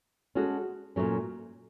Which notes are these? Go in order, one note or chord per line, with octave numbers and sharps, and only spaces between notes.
G#3 C#4 F#4 A4
A#2 F#3 A3 C#4